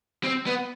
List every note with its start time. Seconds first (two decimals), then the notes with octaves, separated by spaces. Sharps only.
0.24 C4
0.46 B3